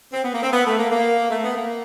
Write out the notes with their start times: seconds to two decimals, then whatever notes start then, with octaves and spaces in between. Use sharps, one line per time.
0.13 C4
0.23 B3
0.33 A#3
0.43 C4
0.53 B3
0.66 A3
0.79 A#3
0.92 A#3
1.31 A3
1.44 B3
1.57 A#3